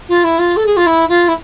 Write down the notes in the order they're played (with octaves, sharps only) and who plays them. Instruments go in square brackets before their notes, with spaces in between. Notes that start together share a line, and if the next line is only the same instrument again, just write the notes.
[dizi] F4
E4
F4
A4
G#4
F4
E4
F4
E4